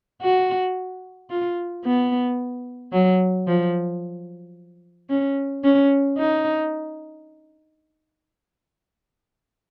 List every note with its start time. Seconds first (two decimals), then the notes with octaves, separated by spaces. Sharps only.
0.22 F#4
1.30 F4
1.85 B3
2.93 F#3
3.47 F3
5.10 C#4
5.64 C#4
6.18 D#4